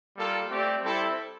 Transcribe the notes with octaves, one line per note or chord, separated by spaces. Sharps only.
G3 A#3 F4 A4
A3 C4 G4 D5
G3 C4 E4 A4 C5